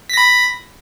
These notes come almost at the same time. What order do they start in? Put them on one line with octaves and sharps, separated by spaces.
B6 A#6 B5